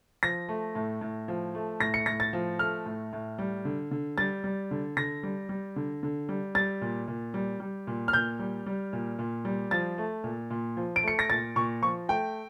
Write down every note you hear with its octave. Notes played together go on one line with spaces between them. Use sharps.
F3 A#6
A3
A2
A2
F3
A3
A2 A#6
C#7
A2 A#6
A6
F3
A3 F6
A2
A2
G3
D3
D3
G3 A6
G3
D3
D3 A#6
G3
G3
D3
D3
G3
G3 A6
A#2
A#2
G3
G3
A#2
F6
A#2 G6
G3
G3
A#2
A#2
G3
F3 A6
A3
A#2
A#2
F3
D7
A3 C#7
A#6
A#2 A6
A#2 C#6
F3 C#6
A3 G5